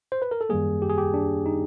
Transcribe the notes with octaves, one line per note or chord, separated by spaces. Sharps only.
C5
B4
A#4
A4
F#2 D#3 G3 A#3 G#4
G4
G#4
G4
D4
D#4